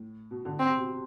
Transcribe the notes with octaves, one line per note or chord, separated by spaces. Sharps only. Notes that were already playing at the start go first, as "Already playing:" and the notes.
Already playing: A2
B2
D3
C4
C3
B2
C3